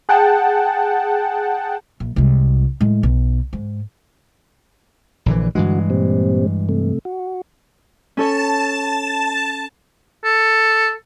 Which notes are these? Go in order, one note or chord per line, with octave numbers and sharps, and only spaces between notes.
G#4 F#5 G5 A5
A#1
C2 G#3
A2 G#3
B1
G#2
A#1 D3 E3
G2 D3 E3 G#3 F#4
A#2 G3 C4
C3 A3
F#4
C#4 A4 C#5 A5
A4